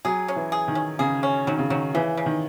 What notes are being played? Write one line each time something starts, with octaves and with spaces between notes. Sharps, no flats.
F#3 G#4
C#4
E3
G#4
D#3
C#4
C#3 G#4
C#4
D#3 F#3
C#3
D#3 F#3
C#3 E3
C#3
D#3